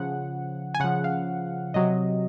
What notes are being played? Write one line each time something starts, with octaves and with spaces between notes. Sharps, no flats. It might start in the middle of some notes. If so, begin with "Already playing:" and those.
Already playing: C#3 F3 F#5
G#5
C#3 F3 F#5
F5
C3 F#3 D#5